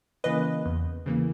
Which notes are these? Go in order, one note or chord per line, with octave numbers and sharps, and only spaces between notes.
C#3 E3 A#3 B4 D#5
E2
C#3 E3 A#3